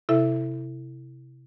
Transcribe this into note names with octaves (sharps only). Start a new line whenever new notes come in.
C3 E4 A4 E5